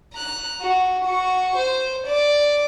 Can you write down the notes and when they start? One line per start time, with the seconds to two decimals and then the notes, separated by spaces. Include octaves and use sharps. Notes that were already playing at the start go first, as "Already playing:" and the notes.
0.13 A#5 F#6
0.61 F#4
1.04 F#4 C#6
1.56 C5
2.06 D5